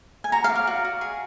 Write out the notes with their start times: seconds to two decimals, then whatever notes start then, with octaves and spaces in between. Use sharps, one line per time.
0.24 G#5
0.32 F#4 A#5
0.44 F5
0.49 D5
0.56 F5
0.67 F#4
0.85 F#4
1.01 G#4